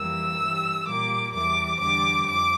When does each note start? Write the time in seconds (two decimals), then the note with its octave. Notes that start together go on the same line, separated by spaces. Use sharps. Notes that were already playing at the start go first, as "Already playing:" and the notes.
Already playing: F2 E3 G3 A#3 E6
0.39 G2 E3 G3
0.87 A#2 G3 A#3 D6
1.33 E2 E3 G3 D6
1.79 E2 D3 G3 D6
2.26 F2 D6